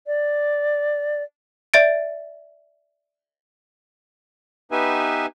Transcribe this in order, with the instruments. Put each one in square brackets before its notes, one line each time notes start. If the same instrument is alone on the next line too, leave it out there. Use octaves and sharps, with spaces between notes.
[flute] D5
[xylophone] D5 E5 A6 D7
[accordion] B3 D#4 G4 B4 E5 G#5